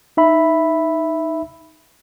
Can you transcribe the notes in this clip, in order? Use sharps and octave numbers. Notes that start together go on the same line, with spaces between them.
D#4 E5 B5